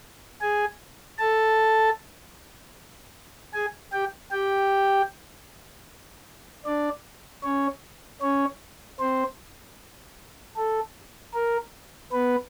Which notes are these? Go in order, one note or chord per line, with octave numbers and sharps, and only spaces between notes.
G#4 G#5
A4 A5
G#4 G#5
G4 G5
G4 G5
D4 D5
C#4 C#5
C#4 C#5
C4 C5
A4
A#4
B3 B4